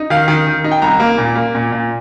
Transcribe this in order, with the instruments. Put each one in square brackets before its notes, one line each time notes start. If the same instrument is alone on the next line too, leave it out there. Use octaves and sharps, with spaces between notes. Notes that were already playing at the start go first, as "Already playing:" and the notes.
Already playing: [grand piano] D#4
D#3 F5
D#3
D#3
D#4
G5
C2 A#5
A#3
A#2
A#3
A#2
A#2